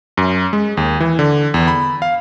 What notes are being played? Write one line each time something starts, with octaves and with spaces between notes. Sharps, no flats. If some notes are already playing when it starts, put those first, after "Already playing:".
F#2
G#3
D#2
E3
D3
E2
B5
F5